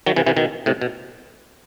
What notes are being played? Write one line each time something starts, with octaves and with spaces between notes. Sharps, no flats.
D#3 F#3
C3 E3
C3 E3
B2 D#3
A2 C3
B2